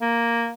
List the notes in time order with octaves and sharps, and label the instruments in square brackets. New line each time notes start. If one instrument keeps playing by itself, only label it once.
[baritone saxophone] A#3